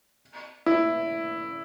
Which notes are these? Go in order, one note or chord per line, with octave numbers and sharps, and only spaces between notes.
E4